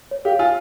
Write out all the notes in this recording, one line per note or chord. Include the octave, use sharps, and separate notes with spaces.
C#5
G4 F5
F4 G#5